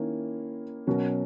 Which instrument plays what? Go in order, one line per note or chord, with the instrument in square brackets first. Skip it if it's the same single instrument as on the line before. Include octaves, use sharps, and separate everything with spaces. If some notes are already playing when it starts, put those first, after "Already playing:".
Already playing: [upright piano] D#3 A#3 C#4 E4
B2 F#3 C#4 F#4 A#4